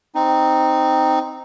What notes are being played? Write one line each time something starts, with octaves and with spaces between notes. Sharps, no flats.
C4 D#4